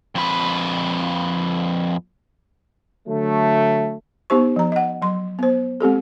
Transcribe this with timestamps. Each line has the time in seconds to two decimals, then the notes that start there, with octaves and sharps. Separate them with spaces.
0.15 F2 B4
3.08 D3 F#3 A3
4.30 B3 D#4 G4 C5 C#6
4.56 F3 A#5
4.72 D#5 F#5
5.02 F#3 C6
5.39 B3 C5
5.81 G#3 C4 G4 A4